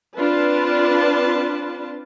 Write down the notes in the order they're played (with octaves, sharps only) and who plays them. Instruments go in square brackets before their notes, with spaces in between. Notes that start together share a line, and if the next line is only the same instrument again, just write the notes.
[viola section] C4 D4 F4 B4 A5